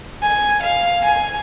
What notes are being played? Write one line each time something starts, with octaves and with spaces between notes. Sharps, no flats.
G#5
F5
G#5